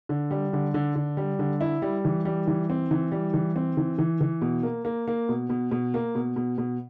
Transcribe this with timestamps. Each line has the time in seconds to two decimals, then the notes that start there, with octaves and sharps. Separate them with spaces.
0.09 D3
0.31 G3
0.53 D3
0.74 D3
0.96 D3
1.17 G3
1.39 D3
1.61 E4
1.82 G3
2.05 E3
2.25 G3
2.47 E3
2.70 C4
2.91 E3
3.12 G3
3.34 E3
3.56 C4
3.77 E3
3.98 E3
4.21 E3
4.41 B2
4.63 A#3
4.85 A#3
5.07 A#3
5.29 B2
5.50 B2
5.71 B2
5.94 A#3
6.15 B2
6.36 B2
6.58 B2